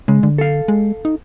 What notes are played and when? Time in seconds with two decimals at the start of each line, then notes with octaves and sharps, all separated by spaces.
0.08 C#3 G#3
0.23 D3
0.38 A4 F5
0.68 G#3
1.05 D#4